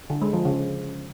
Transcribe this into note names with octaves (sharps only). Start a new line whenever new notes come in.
D3
G#3
F3
C#3